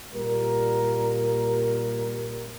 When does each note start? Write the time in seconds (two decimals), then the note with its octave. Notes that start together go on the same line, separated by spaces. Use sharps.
0.14 A#2 G3 A#4